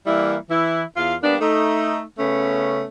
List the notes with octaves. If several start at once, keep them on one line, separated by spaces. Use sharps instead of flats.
E3 G3 A#3 E4
E3 E4
E2 F4 F5
G3 A#3 B3 D4
A3 D#4
C#3 A3 B3 C#4